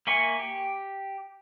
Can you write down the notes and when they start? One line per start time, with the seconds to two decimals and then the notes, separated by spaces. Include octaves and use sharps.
0.07 A#3 E5 G#5 C6 C#6
0.39 G4